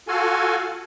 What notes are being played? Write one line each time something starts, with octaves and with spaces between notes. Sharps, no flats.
F4 F#4 A4 G#5